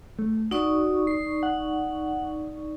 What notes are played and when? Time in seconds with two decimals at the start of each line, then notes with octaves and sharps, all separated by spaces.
0.19 A3
0.51 D#4 F#4 D5 C#6
1.07 C7
1.43 F#5